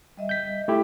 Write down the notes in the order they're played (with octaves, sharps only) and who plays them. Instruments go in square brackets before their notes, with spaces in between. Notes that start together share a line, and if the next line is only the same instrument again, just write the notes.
[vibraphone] G3 D#5 E5
[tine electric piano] G6 B6
A3 E4 G4